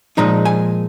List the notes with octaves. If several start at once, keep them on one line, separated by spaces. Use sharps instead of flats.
A#2 F3 G#3 D#4 A#5
G#5